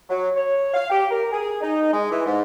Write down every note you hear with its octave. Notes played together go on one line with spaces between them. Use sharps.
F#3
C#5
F5
G4
A#4
G#4
D#4
G#3
E3
G#2